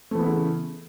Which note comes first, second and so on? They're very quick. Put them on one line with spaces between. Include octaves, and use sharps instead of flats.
A3 E3 B3 E4 C#3